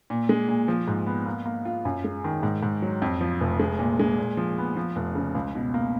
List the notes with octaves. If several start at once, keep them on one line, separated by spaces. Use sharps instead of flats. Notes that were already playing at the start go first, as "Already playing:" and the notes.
A#2
G#3
A#2
F3
G#2
B3
A#3
A#3
F4
F#2
G#3
D#3
G#2
G#2
F#3
F2
F3
F1
G#3
A#2
G#3
A#2
F3
B3
F3
F1
C#3
C#2
B2
A#3